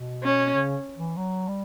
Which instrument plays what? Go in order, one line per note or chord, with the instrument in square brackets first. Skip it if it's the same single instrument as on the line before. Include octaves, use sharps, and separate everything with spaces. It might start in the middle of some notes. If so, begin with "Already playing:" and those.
Already playing: [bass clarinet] B2
[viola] C#4
[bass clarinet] C#3
E3
F#3
G3